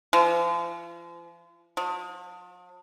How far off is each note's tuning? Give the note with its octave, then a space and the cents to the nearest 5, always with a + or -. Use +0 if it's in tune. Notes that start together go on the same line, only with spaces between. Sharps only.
F3 -40
F3 +45